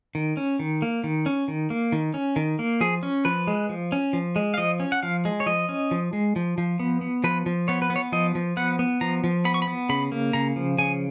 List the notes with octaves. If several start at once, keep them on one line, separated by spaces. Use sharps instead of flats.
D#3
C#4
D#3
A#3
D#3
C#4
D#3
A#3
D#3
C#4
D#3
A#3
F3 G#4
C#4
F3 B4
G#3
F3
C#4
F3
G#3
F5
F3 D#5
C#4
F#5
F3 F5
G#3
C#5
F3 D#5
C#4
F3
G#3
F3
F3
B3
B3
F3 B4
F3
B3 C#5
B4
B3
C#5
F3 D#5
F3
B3 F#5
B3
F3 A#5
F3
B3 B5
C#6
B5
B3
C#3 B5
A#3
C#3 A#5
F3
C#3 G#5